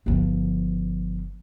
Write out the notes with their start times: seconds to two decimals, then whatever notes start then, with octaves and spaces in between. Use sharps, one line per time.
0.06 G1 F3